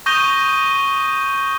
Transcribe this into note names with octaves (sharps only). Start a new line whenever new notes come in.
C#6 D#6 G6 A#6 D#7 G7